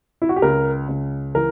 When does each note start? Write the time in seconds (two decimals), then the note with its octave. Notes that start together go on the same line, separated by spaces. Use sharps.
0.22 E4
0.29 F#4
0.36 G4
0.42 C#2 A#4
0.89 C#2
1.35 E3 A#4